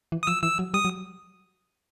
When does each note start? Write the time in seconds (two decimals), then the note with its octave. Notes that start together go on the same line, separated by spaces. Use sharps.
0.12 E3
0.23 D#6
0.27 F3 E6
0.43 E3 E6
0.59 F#3
0.74 G3 D#6
0.85 F#3